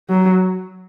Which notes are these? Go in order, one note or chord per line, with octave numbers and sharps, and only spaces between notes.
F#3